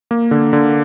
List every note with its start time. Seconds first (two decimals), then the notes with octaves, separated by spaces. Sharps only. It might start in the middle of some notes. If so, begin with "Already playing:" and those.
0.11 A#3
0.31 D3
0.53 D3